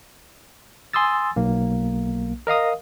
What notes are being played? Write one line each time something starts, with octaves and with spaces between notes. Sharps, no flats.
G#5 C6 D#6 E6 A6
B1 A#3
A#4 D#5 F5 D#6